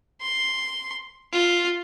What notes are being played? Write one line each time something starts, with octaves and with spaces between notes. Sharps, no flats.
C6
F4